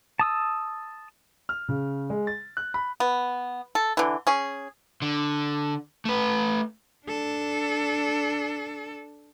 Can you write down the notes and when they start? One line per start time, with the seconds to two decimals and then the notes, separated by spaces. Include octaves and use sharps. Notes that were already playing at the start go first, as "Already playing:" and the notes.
0.19 A5 D#6 E6
1.49 F6
1.68 C#3
2.10 G#3
2.27 A6
2.57 F#6
2.74 B5
3.00 B3
3.75 A4
3.97 D3 E3
4.27 C#4 G#4
5.02 D3
6.05 A3 B4
7.06 D4 A4